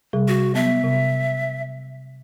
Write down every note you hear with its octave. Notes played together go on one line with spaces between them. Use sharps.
C3 G3 G#4
F#4
F#3 B3 E5
C3